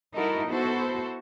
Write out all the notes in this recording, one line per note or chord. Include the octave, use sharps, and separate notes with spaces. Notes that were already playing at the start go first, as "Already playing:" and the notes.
G3 D#4 E4 F#4 A4 A#4
B3 E4 F#4 A4 C5